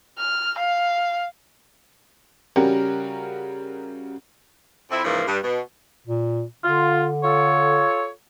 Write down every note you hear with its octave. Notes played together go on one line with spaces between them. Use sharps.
F6
F5
C#3 G3 C#4 F#4 G4 A#4
F2 C4 E4
G#2 C#3 E3 F3 A#3
G2
B2
A#2
D3 F4
F4 A4 C#5